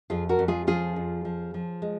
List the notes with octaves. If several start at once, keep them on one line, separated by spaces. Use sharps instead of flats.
F2 F4 G#4
F#4 A#4
F2
F4 G#4
F3 F4 G#4
F2
F3
F3
G#3